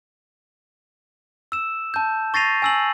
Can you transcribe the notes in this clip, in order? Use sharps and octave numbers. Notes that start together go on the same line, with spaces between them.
E6 E7
A5 G6
C#6 A6 A#6 C7 D#7 F7
G#5 E6 F#7